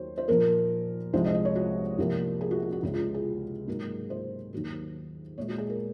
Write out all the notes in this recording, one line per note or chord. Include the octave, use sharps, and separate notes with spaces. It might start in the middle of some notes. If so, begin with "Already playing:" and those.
Already playing: D#2 D#3 F#3 A#3 C5 C#5
C5
A#2 F3 A#3 A#4
C2 C3 F3 G#3 C5
D#5
D#5
C#5
F#4
C2 C3 F3 A#3
G#4
F#4
F4
F#4
C#2 C#3 G#3 F#4
F4
G#4
G#2 F#3 A#3
C5
D#2 D#3 F#3 A#3
A#2 G#3 C#5
F#4
G#4
A#4